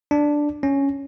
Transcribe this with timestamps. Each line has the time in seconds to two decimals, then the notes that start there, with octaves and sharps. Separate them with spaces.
0.11 D4
0.63 C#4